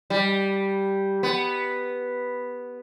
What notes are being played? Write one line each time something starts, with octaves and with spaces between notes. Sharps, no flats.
G3
B3